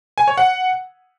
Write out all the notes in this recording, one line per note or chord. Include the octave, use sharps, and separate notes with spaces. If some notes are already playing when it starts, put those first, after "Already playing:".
G#5
C#5
F#5